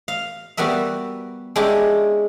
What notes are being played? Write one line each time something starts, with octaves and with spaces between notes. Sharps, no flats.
F5
G3 B3 F#4 A#4 E5
G#3 C#4 D4 E4 G4